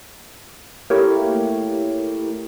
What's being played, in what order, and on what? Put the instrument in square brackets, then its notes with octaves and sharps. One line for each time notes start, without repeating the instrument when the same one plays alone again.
[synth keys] A3 A#3 E4 G4 A#4 C#5